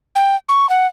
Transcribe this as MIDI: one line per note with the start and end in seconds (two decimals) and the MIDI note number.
0.15 0.36 79
0.49 0.69 85
0.69 0.87 78